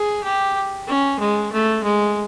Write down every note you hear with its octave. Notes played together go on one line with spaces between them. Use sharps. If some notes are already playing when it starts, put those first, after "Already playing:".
Already playing: G#4
G4
C#4
G#3
A3
G#3